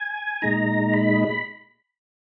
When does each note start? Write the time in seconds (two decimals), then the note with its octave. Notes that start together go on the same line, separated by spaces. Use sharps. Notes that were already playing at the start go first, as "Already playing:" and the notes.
Already playing: G#5
0.42 A#2 G#3 D#4 A#5
0.94 B5